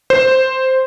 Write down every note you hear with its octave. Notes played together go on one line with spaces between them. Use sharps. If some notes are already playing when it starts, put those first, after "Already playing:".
C5